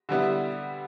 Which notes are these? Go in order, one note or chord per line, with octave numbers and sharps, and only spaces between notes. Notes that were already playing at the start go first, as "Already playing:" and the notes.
D3 G3 B3 E4